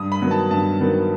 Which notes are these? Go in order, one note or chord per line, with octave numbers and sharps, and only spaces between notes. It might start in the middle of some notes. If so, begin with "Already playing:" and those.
Already playing: G2 D#6
B5
D#3 F#3 B3
A5
G2 A5
D#3 F#3 B3